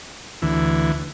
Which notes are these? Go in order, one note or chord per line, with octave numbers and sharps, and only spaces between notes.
D2 E3